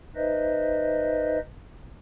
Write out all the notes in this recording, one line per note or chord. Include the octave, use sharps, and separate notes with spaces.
D#4 B4 C5 D#5 E5